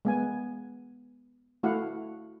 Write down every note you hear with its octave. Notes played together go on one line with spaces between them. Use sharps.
G#3 B3 G#5
A3 E4 F#4 F5 F#5